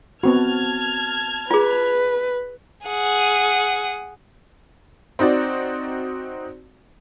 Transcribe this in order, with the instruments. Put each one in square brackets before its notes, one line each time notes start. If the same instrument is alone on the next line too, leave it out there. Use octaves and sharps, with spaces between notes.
[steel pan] B3 C4 F#4 [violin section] A5 F6 G#6
[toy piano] F4 G#4 [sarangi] B4
[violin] G#4 F#5
[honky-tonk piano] C4 D#4 F#4 D5